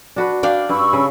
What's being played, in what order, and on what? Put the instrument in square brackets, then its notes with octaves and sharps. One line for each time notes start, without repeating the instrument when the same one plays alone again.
[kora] D4 F#4 B4
[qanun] D4 D5 F5 [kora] G5
[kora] G2 [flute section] B5 C#6 E6
[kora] C#3